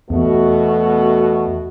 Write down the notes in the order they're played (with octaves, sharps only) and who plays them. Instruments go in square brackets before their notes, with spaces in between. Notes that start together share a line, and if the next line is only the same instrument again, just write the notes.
[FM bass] E2 [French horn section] B2 A3 F#4